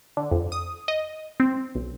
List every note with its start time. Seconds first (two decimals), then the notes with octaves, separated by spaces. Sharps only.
0.17 D3
0.31 F2
0.52 D#6
0.88 D#5
1.40 C4
1.75 B1